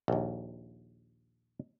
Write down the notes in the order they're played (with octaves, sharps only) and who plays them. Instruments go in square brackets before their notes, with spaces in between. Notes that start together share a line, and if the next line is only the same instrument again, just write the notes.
[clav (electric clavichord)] A#1 D#2